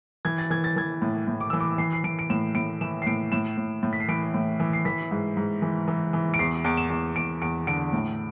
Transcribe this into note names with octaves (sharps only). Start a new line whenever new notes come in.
E3 G#6
A6
E3 G#6
A6
E3 G#6
A2
A2
D6
E3 E6
D6
E3 C7
C7
E3 D7
D7
A2 E7
A2 D7
E3 E7
C7
A2 D7
A2 E7
A2
A2
B6
C7
E3 D7
A2
E3
C7
E3 B6
G#2
G#2
E3
E3
E3
D7
E2 C7
E2 D7
E7
E2
E2 D7
E2 D7
D3 D7
A2